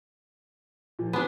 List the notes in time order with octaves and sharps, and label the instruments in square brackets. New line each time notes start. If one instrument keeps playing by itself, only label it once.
[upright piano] A#2 F3
[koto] B3 D4 [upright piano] B4 G#5 B5